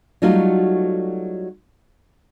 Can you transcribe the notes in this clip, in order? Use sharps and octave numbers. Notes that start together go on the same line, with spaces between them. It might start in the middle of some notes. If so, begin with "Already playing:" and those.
F#3 G3 A3 D#4 F4 F#4